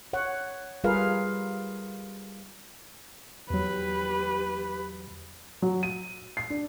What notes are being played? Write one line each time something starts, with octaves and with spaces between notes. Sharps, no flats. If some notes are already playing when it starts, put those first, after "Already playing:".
C#5 F#5
G3 F4 G#4 A#4 B4 F5
E2 F#3 G4 B4
F#3
D#7
C7
D4